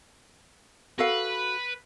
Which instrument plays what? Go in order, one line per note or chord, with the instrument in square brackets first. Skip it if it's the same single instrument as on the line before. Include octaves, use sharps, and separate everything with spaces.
[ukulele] F#4 A4 F5 [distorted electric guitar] B4